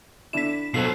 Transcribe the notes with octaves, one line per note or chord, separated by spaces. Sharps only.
D3 D4 E4 B6 E7
B2 F#3 F4 A4 C5 C7